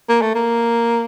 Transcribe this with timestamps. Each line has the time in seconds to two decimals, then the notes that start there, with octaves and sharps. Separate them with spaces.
0.09 A#3
0.22 A3
0.35 A#3